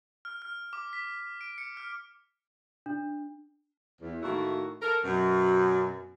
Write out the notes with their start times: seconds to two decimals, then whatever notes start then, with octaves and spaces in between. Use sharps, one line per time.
0.25 F6
0.42 F6
0.73 D6
0.93 B6
1.41 D7
1.58 C#7
1.77 F6
2.86 D4
4.02 E2
4.23 A2 D#3 A3 A#3 E4 F#4
4.82 A4 A#4
5.04 F#2 B2